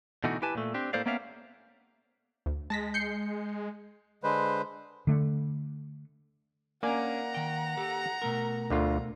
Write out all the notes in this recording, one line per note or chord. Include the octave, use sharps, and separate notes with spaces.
B2 D3 E3 A3 D#4 F#4
E4 G4 B4 G#5 A5
A#2 A3
C4 D4 G4
A2 A#3 A4 C5 D5 F5
A#3 B3 C#4 D5 E5 F5
D2
G#3 A5 A#6 B6
G6 C7 C#7
D3 G#3 B4 C5
D3 A3
A#3 C#4 D4 D5 F#5 G#5 A#5
D#3 G5
G4 A4
B2 A3 A#4
D2 D3 F4